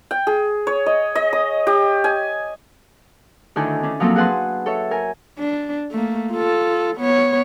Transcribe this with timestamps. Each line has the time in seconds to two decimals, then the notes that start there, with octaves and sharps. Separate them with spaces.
0.11 G5
0.27 G#4
0.67 C#5
0.86 D#5
1.15 D#5
1.33 D#6
1.67 G4
2.04 G#5
3.56 D2 D#3 D4 E4 A4 G#5
3.83 C#4 D4
4.00 F3 F#3 A#3 C4 F4 A4
4.16 F#4 G#4 B4 F#5 A5 C6
4.66 A4 C#5 E5
4.91 A#4 G#5
5.39 D4
5.91 A3 A#3
6.32 F4 A4
6.96 B3 C#5